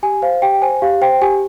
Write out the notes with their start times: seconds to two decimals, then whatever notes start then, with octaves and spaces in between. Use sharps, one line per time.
0.03 G4 G#5
0.22 C5 F5
0.42 G4 G5
0.62 C5 G#5
0.82 G4 F5
1.01 C5 G5
1.22 G4 G#5